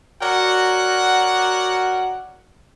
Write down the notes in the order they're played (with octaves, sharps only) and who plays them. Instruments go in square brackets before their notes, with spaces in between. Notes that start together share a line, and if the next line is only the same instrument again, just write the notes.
[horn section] F#3 F#4 A#4 D5 F#5